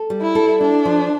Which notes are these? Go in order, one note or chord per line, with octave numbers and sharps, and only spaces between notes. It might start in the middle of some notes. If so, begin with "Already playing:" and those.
Already playing: A4
G3
E4
A4
D4 E4
F3